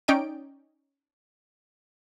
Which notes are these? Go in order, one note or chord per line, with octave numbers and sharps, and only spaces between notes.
C#4 D#4 D5 G5 D7